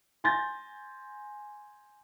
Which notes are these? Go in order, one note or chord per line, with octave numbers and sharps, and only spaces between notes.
G#5 C6 G6 A6 A#6